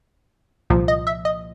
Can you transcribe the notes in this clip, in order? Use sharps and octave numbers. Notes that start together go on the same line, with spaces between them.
C2 A#2 F3
D#5
E5
D#5